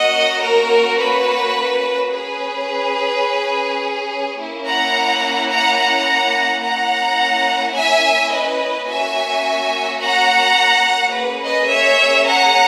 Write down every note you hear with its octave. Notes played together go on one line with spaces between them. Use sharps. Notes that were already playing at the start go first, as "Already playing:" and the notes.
Already playing: A#3 C#4 F#4 D#5 F#5
A#4
B4
C#4 G#4 B4
A#3 C#4 E4
F#5 A#5
F#5 A#5
F#5 A#5
A#3 C#4 E4 F#5 A#5
E5 G#5
B4 D#5
A#3 C#4 F#4 E5 G#5
F#5 A#5
A#3 C#4 G#4 B4
B4 D#5
C#5 E5
F#5 A#5